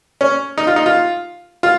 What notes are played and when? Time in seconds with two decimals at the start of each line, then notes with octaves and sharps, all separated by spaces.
0.21 C#4
0.58 D#4
0.67 F4
0.76 D#4
0.86 F4
1.63 F4